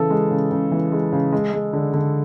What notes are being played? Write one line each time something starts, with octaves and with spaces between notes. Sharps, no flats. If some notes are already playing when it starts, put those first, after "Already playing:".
Already playing: C#3 E3 A4
G#3
C#3
C#3
E3
G#3
C#3
G#3
G#3
D3
D3